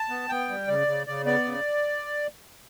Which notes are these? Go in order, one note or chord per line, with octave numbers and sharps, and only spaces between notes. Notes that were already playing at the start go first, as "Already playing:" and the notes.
Already playing: A5
B3
B3 G5
G3
C#3 D5
C#3
C#3 D5
B3 D5
C#3